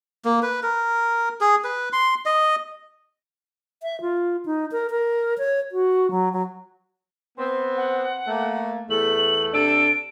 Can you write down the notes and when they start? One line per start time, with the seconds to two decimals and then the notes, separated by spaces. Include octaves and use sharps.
0.25 A#3
0.43 B4
0.63 A#4
1.41 G#4
1.64 B4
1.93 C6
2.26 D#5
3.83 E5
4.01 F4
4.46 D#4
4.72 A#4
4.90 A#4
5.38 C#5
5.72 F#4
6.11 F#3
6.33 F#3
7.38 B3 C4
7.77 F#5
8.28 A3 A#3
8.90 E2 A3 F#7
9.54 C3 D4 A4 D7